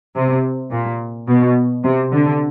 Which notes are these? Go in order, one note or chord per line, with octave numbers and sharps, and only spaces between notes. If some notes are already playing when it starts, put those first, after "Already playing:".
C3
A#2
B2
C3
D3